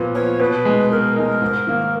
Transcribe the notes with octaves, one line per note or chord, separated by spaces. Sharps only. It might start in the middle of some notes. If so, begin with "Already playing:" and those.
Already playing: A#2 F3 B3
F3 B3 C#5
B2 B4
G#3 D#4
B2 A#4
G#3 D#4
G#2
D#3 A#3